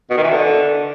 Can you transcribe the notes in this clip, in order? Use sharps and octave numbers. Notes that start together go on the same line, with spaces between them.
B2
D#3
E3
D3